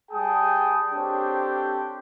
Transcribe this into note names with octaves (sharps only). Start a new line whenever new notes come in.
G3 G#4 G5 A5 D#6
C4 D4 G4 A4 C5 C#5